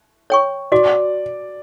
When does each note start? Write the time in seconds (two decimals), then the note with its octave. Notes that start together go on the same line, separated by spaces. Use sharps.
0.30 C#5 G5 C#6
0.72 F#4 D5